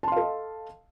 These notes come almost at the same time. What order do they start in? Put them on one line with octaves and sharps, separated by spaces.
A5 C6 F5 A4 D#5